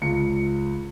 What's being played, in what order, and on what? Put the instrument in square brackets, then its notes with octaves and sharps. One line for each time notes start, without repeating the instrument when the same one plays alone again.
[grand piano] C#2 C#7